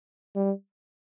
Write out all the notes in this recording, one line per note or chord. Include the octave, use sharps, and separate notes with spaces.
G3